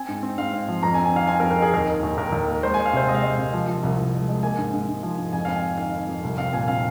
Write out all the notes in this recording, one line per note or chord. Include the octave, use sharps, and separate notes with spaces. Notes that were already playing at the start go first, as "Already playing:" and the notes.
Already playing: C4 G#5
G#2
C4
G#2 F5
C4
F3
F2 A#5
G#5
C4
G#5
D#3 F5
C4 G#5
A#4
F2
A#4
D#4 G#4
D#2 A#4
D#3
D#2
D#2 A#4
D#2
A#3
G#3 C5
G#5
G#3
F5
C3 C5
G#3 D#5
F5
G#3 D#5
C3
F3
F3
C2
C2
G#3
G#3
A#3 G#5
G#2
G#2
G#2
F3
G#2
F2 G#5
C4 F5
G#5
D#4
D#3 F5
D#3
F2
C2
C4 F5
A#2 G#5
C4 F5